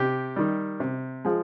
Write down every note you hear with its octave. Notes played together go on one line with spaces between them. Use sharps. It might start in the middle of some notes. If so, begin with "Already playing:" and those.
Already playing: C3 G4
D#3 G3
C3
F3 G#3